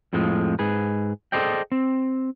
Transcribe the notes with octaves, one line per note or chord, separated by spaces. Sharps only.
F2 A2 F3 G#3
G#2 G#4 B4
G#4 A4 C5 D5 D#5 G5
C4